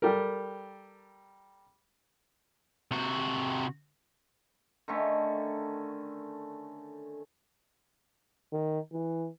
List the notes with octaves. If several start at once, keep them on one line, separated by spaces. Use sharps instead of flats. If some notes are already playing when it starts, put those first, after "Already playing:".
G3 G4 A4 A#4
C3 F#4
D3 D#3 A3 C#4
D#3
E3